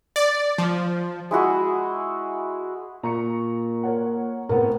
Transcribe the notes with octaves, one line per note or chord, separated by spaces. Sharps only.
D5
F3
G#3 E4 F#4 G#4
A#2 A#5 C#6 C#7
A#4 C#5 F#5
A2 B3 C4 A#4